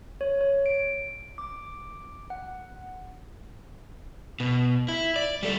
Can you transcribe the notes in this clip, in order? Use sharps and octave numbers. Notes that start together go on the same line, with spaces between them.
C#5
C#5
D7
D6
F#5
B2
E4
D5
G3 A4